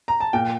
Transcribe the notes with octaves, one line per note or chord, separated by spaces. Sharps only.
A#5
A5
A#2 G5